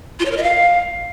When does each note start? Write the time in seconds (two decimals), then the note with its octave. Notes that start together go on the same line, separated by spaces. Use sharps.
0.19 F4
0.25 C#5
0.31 A#4
0.37 D#5
0.43 F5